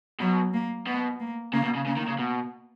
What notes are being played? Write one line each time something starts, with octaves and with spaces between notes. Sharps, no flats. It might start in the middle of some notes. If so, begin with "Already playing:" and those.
B2 F#3
A#3
B2 B3
A#3
C#3 A#3
B2
C#3
C#3 A#3
D#3
C#3
B2